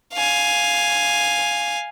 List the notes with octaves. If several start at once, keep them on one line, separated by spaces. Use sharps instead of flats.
F5 G#5